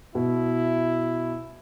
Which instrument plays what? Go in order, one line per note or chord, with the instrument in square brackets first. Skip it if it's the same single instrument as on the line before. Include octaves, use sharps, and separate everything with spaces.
[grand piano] B2 [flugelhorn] E4